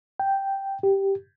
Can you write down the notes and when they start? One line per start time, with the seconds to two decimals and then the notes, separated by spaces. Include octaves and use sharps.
0.20 G5
0.83 G4